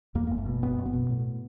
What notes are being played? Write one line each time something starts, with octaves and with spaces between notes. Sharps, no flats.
E2 A#3
F#1 A#3
A3
B2
F#1 B3
F#1
B3
B2
A2